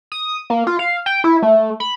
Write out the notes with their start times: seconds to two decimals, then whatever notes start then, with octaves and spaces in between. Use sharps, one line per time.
0.12 D#6
0.50 A#3
0.67 F4
0.79 F5
1.06 G5
1.24 E4
1.42 A3
1.80 B5